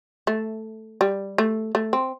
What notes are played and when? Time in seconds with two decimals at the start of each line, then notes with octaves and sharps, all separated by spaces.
0.27 A3
1.01 G3
1.38 A3
1.75 A3
1.93 C4